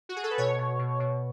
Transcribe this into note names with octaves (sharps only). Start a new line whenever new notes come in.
F#4
G#4
A4
B4
B2 C#5
B2
B2
B2